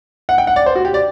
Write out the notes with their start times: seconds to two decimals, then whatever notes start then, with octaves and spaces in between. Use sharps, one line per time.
0.29 F#5
0.38 G5
0.47 F#5
0.56 D5
0.66 C5
0.75 F#4
0.85 G4
0.94 D5